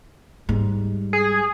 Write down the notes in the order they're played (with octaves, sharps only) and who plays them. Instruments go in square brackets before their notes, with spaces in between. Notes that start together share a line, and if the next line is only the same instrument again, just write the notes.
[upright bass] G#2 G3
[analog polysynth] G#4